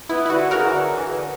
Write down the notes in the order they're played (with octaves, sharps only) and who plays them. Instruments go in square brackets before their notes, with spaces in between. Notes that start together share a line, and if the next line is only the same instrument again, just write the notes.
[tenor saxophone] B3 [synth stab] E4
[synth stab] E4
[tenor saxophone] D3 [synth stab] F#4
[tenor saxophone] C#3 [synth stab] F#4 A#4
[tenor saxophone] E3
D3
E3
C#3
D3